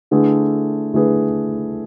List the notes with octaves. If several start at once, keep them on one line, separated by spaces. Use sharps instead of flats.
D3 A3 E4 G#4 B4
D3 A3 E4 G#4 B4